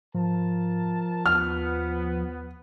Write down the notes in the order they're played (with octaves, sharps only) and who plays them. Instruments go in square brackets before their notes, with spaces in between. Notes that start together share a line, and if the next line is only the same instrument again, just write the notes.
[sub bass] G#2 [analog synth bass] F3 [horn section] A#4 A5
[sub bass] D#2 [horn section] B3 [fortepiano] F6